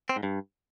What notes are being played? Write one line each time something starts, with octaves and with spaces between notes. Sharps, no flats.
C4
G#2
G2